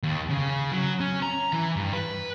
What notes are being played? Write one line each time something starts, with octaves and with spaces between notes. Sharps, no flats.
D#2
C#3
F#3
C#4
A#5
E3
G2
B4